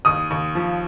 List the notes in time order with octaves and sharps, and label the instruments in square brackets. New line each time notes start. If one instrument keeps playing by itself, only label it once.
[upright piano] D#2 [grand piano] D#6
[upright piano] D#2
F3